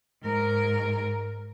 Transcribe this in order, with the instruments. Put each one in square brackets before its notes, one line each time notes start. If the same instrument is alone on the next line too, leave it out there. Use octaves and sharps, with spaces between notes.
[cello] G#2 A#4